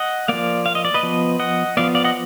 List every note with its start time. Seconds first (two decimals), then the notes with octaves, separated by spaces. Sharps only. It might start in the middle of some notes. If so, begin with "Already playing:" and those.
Already playing: D#5 F#5
0.28 F3 A#3 D5 F5
0.66 F5
0.75 D#5
0.85 D5
0.94 B4 D#5
1.03 F3 B3
1.39 D#5 F#5
1.77 F3 B3 D5 F5
1.95 D5 F5
2.04 D#5 F#5